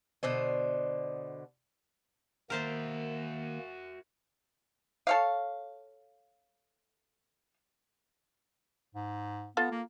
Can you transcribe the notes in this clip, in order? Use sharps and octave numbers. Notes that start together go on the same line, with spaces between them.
B2 D3 C5 D#5
D#3 A#3 F#4 A#4 C5 E5 A5
A4 C#5 F5
G#2
B3 F4 A4 F5
A#3